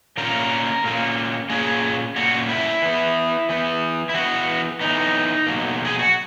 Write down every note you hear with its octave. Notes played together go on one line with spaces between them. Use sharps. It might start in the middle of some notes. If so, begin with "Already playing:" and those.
A#2 A#3 C#4 A#4
A#2 A#3 C#4
A#2 A#3 C#4 G#4
A#2 A#3 C#4 F#4
E4
E3 B3
E3 B3
E4
E3 B3 F#4
E3 B3 D#4
B2 F#3 A#3
G#4
F#4